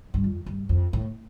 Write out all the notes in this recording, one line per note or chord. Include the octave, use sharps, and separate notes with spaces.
G2
F2
G2
F2
A2